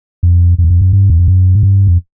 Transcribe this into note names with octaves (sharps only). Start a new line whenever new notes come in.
F2
F2
E2
F2
F#2
G2
E2
F2
F#2
G#2
G2
F2